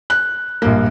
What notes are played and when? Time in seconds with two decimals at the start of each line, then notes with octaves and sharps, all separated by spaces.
0.10 F#6
0.62 A#1 G2 A#3